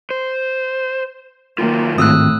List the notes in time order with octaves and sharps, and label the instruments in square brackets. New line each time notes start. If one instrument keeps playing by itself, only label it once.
[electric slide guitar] C5
[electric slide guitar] D#3 F#3 F4 [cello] A#3
[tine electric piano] G#1 [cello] A2 [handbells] D#6 E6 F#6